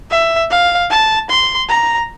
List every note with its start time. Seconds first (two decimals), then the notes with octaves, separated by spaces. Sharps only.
0.11 E5
0.51 F5
0.90 A5
1.30 C6
1.69 A#5